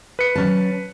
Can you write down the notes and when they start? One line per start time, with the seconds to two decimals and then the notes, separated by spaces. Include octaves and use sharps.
0.19 B4 C#7
0.35 F#3 C#4 A5